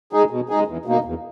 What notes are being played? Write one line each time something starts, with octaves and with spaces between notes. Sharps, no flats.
G#3 D#4 G#4
B2
G#3 D#4 G#4
E2
B2 A#3 D#4
E2